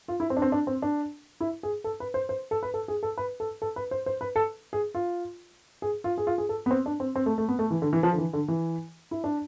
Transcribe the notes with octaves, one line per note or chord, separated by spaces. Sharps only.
F4
E4
C4
D4
C4
D4
C4
D4
E4
G#4
A4
B4
C5
C5
A4
B4
A4
G#4
A4
B4
A4
A4
B4
C5
C5
B4
A4
G#4
F4
G#4
F4
G#4
F4
G#4
A4
B3
C4
D4
C4
C4
A3
A3
B3
A3
E3
D3
E3
F3
D3
E3
D3
E3
E4
D4